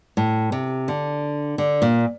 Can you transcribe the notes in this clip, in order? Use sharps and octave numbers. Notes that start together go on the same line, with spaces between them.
A2
C3
D3
D3
A#2